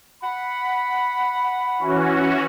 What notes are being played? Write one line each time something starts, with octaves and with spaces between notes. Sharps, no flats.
F#5 B5
E3 C#4 F#4